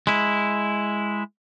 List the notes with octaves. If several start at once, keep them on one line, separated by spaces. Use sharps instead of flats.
G#3 E4